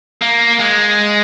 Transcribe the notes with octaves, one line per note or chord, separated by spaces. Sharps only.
A#3
G#3